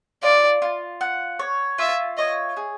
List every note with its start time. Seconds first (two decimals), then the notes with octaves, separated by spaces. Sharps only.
0.23 F4 D5
0.62 F4
1.01 F#5
1.39 C#5
1.78 F4 E5
2.17 C#5 D#5
2.57 G#4